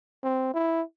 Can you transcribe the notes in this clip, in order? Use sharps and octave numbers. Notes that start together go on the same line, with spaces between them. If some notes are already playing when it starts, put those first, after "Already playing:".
C4
E4